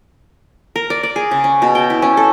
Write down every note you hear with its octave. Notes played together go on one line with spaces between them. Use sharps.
A#4
D5
D5
G#4
C#3
C#4
B2
G5
E4
C#4
A4